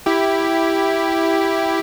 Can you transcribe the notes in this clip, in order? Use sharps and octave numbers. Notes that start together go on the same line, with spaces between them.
E4 G4